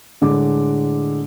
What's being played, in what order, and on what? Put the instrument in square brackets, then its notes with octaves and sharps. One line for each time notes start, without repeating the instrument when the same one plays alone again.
[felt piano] A2 D3 G#3 D6